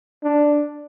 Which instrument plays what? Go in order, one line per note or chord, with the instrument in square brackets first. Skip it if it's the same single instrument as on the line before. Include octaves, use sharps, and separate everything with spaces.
[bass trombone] D4